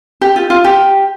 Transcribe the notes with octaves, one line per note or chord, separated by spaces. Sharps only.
G4
F4
F4
G4